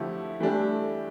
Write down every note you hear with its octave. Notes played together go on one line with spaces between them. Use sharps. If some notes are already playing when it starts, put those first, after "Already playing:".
Already playing: D3 F3 A3 E4 G4
E3 G3 A3 D4 G4